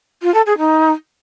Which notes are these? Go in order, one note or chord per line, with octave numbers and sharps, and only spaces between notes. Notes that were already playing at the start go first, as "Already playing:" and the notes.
F4
A4
G#4
D#4